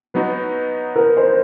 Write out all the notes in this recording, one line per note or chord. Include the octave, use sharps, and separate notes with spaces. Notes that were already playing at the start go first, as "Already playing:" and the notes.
F#3 B3 D#4 F#4 B4
A#4
C5